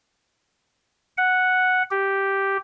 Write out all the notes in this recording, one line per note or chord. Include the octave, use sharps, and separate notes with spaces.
F#5
G4